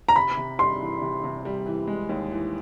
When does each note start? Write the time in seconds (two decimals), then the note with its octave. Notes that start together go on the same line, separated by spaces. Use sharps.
0.09 A#5
0.16 C3 B5
0.37 C3
0.59 G3 C6
0.81 E3
1.01 C3
1.24 C3
1.45 G3
1.66 E3
1.87 G#3
2.09 D#2
2.31 E3